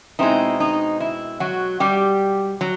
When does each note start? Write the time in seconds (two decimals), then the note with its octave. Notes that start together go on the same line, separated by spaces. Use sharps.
0.19 B2 G#3 C4 D#4 E4
0.60 D#4
1.00 E4
1.40 F#3 F#4
1.80 G3 G4
2.61 F#3